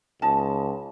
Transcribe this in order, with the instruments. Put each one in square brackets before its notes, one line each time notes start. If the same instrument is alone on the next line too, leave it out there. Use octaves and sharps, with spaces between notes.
[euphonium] C#2 [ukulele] D#4 A5